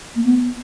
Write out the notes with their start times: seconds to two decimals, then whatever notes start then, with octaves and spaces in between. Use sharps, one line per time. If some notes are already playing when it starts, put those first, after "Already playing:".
0.16 A#3
0.24 B3